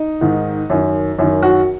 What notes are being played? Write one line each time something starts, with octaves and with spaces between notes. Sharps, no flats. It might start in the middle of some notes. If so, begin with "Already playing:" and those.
Already playing: D#4
G#2 D#3
F#2 D#3
F#2 D#3
F#4